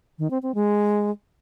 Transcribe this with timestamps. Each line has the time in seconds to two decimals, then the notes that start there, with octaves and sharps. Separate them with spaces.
0.19 D#3
0.31 C4
0.43 C4
0.55 G#3